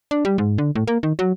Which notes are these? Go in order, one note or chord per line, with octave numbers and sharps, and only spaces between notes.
D4
G3
G#2
D3
A2
A#3
D#3
F#3